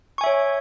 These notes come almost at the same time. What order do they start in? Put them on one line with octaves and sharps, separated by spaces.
C#6 G#5 E5 C#5